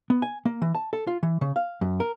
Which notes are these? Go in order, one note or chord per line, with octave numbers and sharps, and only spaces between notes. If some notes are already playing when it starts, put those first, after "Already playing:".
B3
G#5
A#3
E3
A5
A4
F4
E3
C#3
F5
F#2
A#4